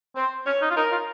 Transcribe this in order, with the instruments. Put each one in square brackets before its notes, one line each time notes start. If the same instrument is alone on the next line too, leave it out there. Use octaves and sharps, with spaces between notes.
[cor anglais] C4 [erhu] C5
[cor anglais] C#4 [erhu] C#5
[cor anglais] D#4
F4
[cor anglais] D#4 [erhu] A#4
[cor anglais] F4